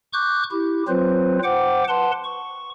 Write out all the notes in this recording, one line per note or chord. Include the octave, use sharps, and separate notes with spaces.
C#6 D6 F#6 G6
E4 G4
F#3 C4 F4 B4 C5
C5 F#5 G5 D6
B4 F#5 A5 C6
C#6